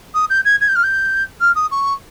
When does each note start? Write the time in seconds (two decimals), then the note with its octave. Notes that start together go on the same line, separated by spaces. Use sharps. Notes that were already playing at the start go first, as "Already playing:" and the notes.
0.14 D#6
0.30 G6
0.45 G#6
0.61 G#6
0.68 G6
0.76 F6
0.83 G6
1.40 F6
1.55 D#6
1.71 C#6